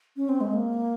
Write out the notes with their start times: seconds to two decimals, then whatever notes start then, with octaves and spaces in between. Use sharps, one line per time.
0.17 C#4
0.29 C4
0.41 G#3
0.53 A#3